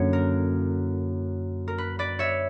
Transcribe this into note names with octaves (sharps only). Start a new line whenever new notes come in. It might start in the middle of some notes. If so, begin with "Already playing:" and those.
Already playing: F#2 D3 A#3 C#4 E4 C#5
A#4
A#4
B4
B4 D5
C#5 E5